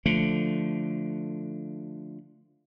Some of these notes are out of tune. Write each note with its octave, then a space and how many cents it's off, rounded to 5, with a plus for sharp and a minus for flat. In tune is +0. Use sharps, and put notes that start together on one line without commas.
D3 +0 F3 +0 A3 +5